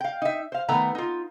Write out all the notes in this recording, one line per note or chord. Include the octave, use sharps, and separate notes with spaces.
F5 G5
D#4 E5
C5 F5
D#3 A3 B3 B4 G#5 A#5
D#4 F4